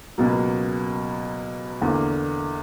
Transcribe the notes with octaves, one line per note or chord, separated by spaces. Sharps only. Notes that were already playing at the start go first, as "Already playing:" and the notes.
C#2 B2 F#3 A#3
E2 D3 A#3